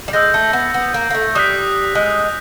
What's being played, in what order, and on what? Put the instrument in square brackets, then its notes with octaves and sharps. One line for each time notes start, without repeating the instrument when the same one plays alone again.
[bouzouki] G3
[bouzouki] G#3 [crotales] E6 G6 A#6
[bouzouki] A3
B3
B3
A#3
A#3
A3
[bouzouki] G3 [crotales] D#6 F#6 B6
[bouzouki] G#3